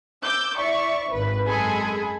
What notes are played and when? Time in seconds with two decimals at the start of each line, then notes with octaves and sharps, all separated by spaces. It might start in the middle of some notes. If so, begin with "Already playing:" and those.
0.24 D6 E6 G6
0.57 E4 D5 E5 C#6
1.12 G#1 B4
1.47 F#2 G#3 G#4 A4 G#5 B5